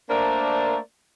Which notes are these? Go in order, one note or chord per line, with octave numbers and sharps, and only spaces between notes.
A3 A#3 D4 A#4 C5 D5